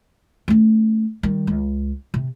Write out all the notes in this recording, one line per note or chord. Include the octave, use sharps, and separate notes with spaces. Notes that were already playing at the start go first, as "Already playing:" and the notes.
A3 C#4
D#3 G3
C#2
C3